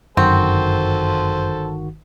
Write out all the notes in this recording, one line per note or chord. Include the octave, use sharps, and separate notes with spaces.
G1 F#2 D#3 C4 F#4 A4 C5